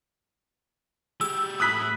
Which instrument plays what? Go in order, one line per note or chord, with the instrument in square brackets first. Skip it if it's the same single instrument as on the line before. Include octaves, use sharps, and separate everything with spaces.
[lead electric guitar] G#3 G4 [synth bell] E6
[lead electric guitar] A2 [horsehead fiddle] B5 [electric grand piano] D#6 F#6 B6